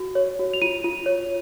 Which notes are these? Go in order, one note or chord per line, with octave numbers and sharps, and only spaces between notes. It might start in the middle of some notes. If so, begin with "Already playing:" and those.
Already playing: F#4
C#5
F#4
F7
F4 D#7
F4
C#5